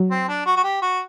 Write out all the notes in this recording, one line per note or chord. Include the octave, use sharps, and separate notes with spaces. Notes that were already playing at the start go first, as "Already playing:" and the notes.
Already playing: F#3
C4
D4
F#4
F#4
G4
F#4